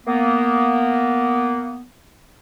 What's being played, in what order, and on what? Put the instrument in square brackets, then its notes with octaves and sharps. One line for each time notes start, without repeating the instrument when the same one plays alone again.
[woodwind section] A#3 B3